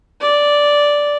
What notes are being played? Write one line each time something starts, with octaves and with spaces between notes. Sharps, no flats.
D5